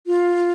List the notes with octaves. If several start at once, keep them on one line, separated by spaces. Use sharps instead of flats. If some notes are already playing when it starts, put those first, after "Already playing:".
F4